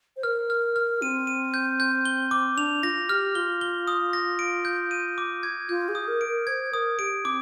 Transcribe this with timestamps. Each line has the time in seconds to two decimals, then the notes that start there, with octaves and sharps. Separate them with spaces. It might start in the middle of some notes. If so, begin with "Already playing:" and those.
0.17 C5
0.23 A#4 F6
0.50 F6
0.76 F6
1.02 C4 D#7
1.27 D#7
1.54 G6
1.80 G6
2.05 G7
2.31 D6
2.57 D4 F7
2.83 F4 A#6
3.09 G4 F6
3.35 F4 G7
3.61 G7
3.88 D#6
4.13 A#6
4.39 D7
4.65 G6
4.91 D#7
5.18 D6
5.43 G#6
5.69 F4 G6
5.89 G#4
5.95 D#6
6.08 A#4
6.21 D7
6.28 A#4
6.47 C5 G#6
6.73 A#4 D#6
6.99 G4 D7
7.25 C4 D6